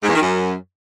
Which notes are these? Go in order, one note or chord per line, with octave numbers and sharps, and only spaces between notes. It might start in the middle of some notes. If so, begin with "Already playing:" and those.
G#2
E2
D#3
F#2